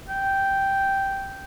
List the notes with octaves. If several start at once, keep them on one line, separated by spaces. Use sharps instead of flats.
G5